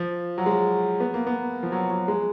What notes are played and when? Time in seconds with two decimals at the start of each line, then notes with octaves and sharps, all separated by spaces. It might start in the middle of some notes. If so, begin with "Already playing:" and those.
Already playing: F3
0.38 F#3
0.46 G#3
1.00 B3
1.14 A#3
1.27 B3
1.63 F3
1.72 F#3
1.90 F#3
2.08 G#3